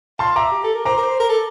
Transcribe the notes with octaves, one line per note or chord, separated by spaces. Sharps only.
F5 A5 C6
E5 A#5 D6
G4
A4
A#4
C5 A#5 D6
A#4
C5
A#4
A4